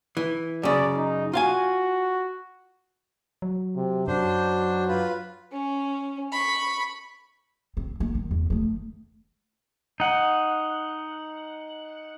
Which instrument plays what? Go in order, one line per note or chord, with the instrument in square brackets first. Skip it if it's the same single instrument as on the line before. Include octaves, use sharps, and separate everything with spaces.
[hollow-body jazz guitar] E3
[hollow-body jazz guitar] F#2 C#3 [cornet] D5
[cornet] D#4
[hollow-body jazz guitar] F4 F5 G#5 [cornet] F#4
[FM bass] F#3
[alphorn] C3
[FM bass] F#2 [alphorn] F#3 [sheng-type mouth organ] D4 C5
[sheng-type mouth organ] F4 B4
[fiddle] C#4
B5 C#6
[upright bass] C4
A#3
D#3
E2
D#3 A3
[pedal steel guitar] D#4 F#5